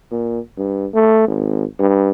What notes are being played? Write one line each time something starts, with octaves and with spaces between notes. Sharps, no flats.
A#2
G2
A3
G#1
G2